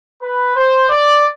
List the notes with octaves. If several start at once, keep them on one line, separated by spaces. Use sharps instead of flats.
B4
C5
D5